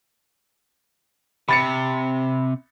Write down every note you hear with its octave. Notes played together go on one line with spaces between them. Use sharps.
C3 B5 A6 C#7